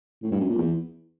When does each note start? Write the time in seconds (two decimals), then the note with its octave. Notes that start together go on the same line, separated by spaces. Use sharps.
0.23 A2
0.32 G2
0.40 F#2
0.49 A#2
0.58 E2